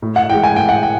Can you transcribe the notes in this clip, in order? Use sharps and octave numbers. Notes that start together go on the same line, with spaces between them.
A2
F#5
E3 G#3 G5
G#5
A2 G5
F#5
G5